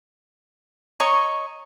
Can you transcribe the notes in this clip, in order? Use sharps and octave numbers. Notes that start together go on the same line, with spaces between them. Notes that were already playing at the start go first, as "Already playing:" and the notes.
C#5 D#5 A#5 C#6